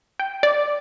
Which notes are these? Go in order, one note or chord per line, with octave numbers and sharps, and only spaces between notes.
G5
D5